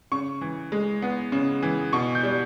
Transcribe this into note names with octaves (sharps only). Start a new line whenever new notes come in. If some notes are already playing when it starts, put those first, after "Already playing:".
C#3 C#6
E3
G#3
B3
C#3
E3
B2 C#6
G6
G3